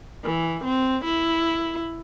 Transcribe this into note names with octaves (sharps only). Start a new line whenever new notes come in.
E3
C4
E4